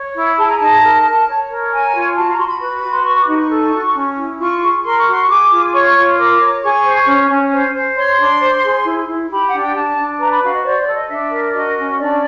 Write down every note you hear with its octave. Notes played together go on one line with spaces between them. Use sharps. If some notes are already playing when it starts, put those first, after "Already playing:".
Already playing: C#5
E4
G#4 A5
A#5
D#4 A5
A#4
A#4
C#5
A#4
C#5 G#5
F4
F#4 A5
A#5
F#4 C6
B5
B4 B5
B5
F#4
C6
B4 C#6
D6
D#4
C#6
A4
F#4
C#4
E4
F4 C#6
G#4
A#4 C6
C#6
F#4 C6
C#6
G#4 D6
F4
C#5 C#6
F4
A#4 D6
C#5
G#4 C#6
C5
C#4
C#4
C5
C5
C#5 C6
D4
C5
G#4
E4
E4
G4 B5
F#5
D4
G5
D4 A5
D4
B4 A#5
B5
F#4 F5
D#5
C5 D5
D5
A4
D#5
D4 E5
A#4
F#4 D#5
C#4
D4 D5